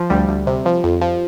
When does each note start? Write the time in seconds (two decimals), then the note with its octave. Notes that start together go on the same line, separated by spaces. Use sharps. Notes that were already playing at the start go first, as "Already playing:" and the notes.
Already playing: F3
0.10 D2 G3
0.28 D2
0.47 C3
0.66 F3
0.84 F2
1.01 F3